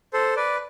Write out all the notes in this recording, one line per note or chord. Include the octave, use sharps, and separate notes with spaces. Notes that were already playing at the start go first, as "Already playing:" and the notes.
A4 C5
B4 D5